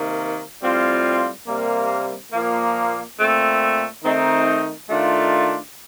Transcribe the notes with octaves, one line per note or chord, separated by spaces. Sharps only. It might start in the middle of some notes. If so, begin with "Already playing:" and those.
Already playing: C3 D#3 A#3
A2 G3 C4 F4
C3 G3 A#3
A#2 F3 A#3
A#2 A3 C4
D#3 A3 C4 D#4
D#3 A3 D4 F4